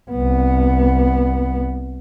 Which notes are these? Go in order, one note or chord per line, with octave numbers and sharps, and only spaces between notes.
C2 B3